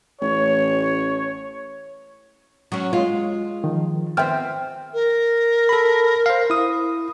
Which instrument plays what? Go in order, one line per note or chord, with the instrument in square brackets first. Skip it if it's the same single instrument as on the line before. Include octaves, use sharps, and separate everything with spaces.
[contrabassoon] A1 [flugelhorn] C#5
[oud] F#3 C#4
[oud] G#3 [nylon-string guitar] F4
[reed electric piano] D#3 F3
[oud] B3 C4 [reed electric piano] E5 G5 F6
[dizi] A#4
[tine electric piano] A4 B5
C5 F5
E4 D#6